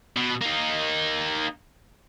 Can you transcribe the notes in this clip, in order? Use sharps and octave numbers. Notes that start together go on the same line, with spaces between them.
B2
A#3 D#4